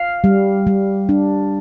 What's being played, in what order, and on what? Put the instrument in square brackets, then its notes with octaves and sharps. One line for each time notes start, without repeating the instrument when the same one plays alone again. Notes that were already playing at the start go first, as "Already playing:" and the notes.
Already playing: [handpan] F5
G3
G3
D4